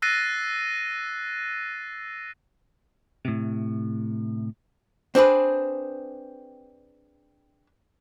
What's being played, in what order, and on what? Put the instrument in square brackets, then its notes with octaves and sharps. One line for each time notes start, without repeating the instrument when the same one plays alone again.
[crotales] E6 F#6 A6 A#6 C7 D#7
[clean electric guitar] A2 C3
[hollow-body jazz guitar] C4 D4 G#4 B4